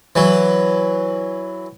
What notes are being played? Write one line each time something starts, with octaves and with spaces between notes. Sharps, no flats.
E3 F#3